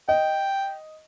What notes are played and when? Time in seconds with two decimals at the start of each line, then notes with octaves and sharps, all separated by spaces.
0.09 D#5 G5